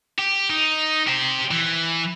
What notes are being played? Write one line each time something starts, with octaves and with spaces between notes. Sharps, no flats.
G4
D#4
G4 C5
E3